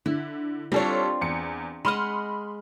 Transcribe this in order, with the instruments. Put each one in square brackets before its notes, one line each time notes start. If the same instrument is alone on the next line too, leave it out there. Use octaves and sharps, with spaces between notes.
[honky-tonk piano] D3 [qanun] E4
[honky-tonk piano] G3 A4 C#5 [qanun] C4 D4 F4
[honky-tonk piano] E2 C#7
[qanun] G#3 D#5 F#5 [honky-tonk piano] B5 C6 F6